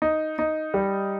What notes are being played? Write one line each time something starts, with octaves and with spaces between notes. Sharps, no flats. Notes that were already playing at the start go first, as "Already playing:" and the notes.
D#4
D#4
G3